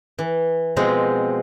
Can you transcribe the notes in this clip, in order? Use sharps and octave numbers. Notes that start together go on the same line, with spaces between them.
E3
B2 F3 G#3 C4